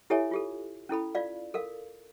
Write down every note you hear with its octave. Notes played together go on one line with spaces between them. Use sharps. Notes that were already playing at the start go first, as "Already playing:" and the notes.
E4 G4 A4 C#5 E5 G#5
F4 G4 A4
C#4 E4 A4 B5
F4 D5 F5
A4 A#4 F5